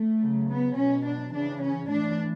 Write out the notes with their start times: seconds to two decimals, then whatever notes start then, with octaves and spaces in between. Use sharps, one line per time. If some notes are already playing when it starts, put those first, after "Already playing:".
Already playing: A3
0.19 C#3 F#3
0.47 B3
0.76 B2 F#3 C#4
1.04 D4
1.32 C#3 E3 D4
1.61 C#4
1.88 A2 E3 D4